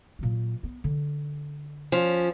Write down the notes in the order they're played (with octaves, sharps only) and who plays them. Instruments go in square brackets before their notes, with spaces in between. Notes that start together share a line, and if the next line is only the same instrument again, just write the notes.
[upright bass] A#2 F#3
B3
D3
[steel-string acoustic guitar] F3 C#4